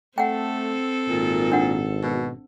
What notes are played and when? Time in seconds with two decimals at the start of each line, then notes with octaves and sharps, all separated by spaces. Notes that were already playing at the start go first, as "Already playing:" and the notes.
0.18 A3 C4 A4 F#5 G5
1.09 G#1 A#2
1.52 D4 F#5
2.03 B2